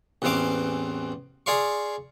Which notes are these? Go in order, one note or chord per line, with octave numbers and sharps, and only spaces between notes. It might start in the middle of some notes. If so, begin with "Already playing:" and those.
A1 E2 E3 C4 F5 D6
G#4 D5 F5 C6 C#6